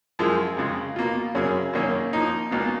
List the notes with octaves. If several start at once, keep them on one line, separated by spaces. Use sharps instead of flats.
F#2 F3 G#3
F2 C#3 G#3
B2 A#3 F4
F#2 C#3 F#3 C#4 G#4
F#2 D#3 A#3 C#4
F3 A#3 D#4
C#2 B2 A#3